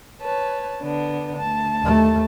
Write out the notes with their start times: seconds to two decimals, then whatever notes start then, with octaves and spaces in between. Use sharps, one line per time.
0.21 B4 C#5 A5
0.80 D3 B3 D4
1.36 D2 A5
1.82 D#2 A3